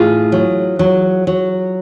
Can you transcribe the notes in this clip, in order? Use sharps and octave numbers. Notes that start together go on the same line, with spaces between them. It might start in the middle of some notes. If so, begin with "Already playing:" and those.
Already playing: A2 F4 G#4
F#3
F#3
F#3